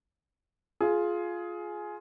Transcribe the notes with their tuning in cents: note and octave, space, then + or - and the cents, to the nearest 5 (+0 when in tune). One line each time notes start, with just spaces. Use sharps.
F4 +0 G#4 +15